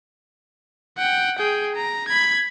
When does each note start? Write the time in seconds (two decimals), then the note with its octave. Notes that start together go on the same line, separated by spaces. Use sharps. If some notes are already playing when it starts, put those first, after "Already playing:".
0.98 F#5 G5
1.38 G#4 G5
1.76 A#5
2.08 B5 G#6